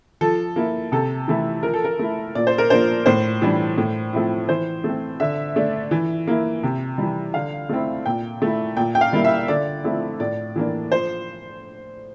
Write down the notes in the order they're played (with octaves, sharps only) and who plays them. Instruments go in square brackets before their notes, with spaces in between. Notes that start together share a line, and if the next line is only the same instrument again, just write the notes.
[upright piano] F3 A4
A#3 E4
C3 A4
E3 A3 E4
F3 A#4
A4
A#4
A3 E4
A#2 D5
C5
A#4
F3 A#3 D4 C5
A2 C5
E3 G3 D4
A2
F3 A3 C4 E4
E3 C5
A3 C4
D3 E5
A3 D4
E3
A#3 E4
C3
E3 G3
D3 F5
A3 C4 E4
A#2 G5
A3 E4
A#2 G5
G5
F5
G3 A#3 E4
E5
D3 D5
F3 A3 C4 E4
A2 D5
E3 A#3 D4
F3 C5